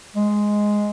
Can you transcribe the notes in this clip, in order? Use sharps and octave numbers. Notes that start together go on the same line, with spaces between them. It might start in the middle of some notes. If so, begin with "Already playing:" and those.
G#3